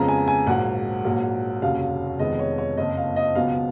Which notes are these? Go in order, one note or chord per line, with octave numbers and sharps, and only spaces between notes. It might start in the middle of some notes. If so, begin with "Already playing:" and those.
Already playing: F2 C#3 G#3 B3 A#5
G#5
G#5
A#1 G#2 F#3 A#3 F#5
A#1 G#2 F#3 A#3
F1 D#2 C#3 F#3 F5
F1 F2 D#3 G#3 B3 D#5
C#5
C#5
F#1 F2 F3 A#3 D#5
F5
D#5
C#2 B2 F#3 B3 F5